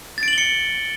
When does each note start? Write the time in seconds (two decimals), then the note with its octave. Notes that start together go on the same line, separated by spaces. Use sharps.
0.18 A6
0.23 D7
0.28 F#7
0.33 G7
0.38 C#7